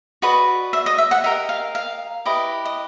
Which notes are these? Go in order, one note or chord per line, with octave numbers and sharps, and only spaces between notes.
F#4 B4 D5 D#5
E5
D#5
E5
F#5
G4 A#4 D#5 E5
F5
F5
E4 G4 B4 D#5
D#5